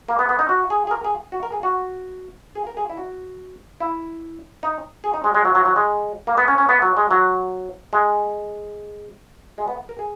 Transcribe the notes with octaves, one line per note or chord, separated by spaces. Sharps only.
A#3
B3
B3
D#4
F#4
G#4
G#4
A#4
G#4
F#4
A#4
G#4
F#4
G#4
A#4
G#4
E4
F#4
E4
D#4
G#4
D#4
G#3
G#3
F#3
F#3
F#3
G#3
A#3
B3
C#4
C#4
B3
F#3
G#3
F#3
G#3
G#3
B3
A#4
G#4